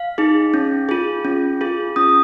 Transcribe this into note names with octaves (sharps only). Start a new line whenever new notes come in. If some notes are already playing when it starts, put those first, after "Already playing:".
Already playing: F5
D#4 G#4
C#4
F4 G#4
C#4
F4 G#4
C#4 D#6